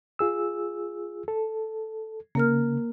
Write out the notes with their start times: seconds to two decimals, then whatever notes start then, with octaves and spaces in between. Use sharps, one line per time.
0.19 F4 G#4 E6
1.28 A4
2.35 C#3 A#3 A#4 F6